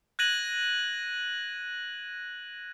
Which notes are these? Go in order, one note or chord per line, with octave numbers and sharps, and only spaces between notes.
F#6 G#6 A#6 D#7 F#7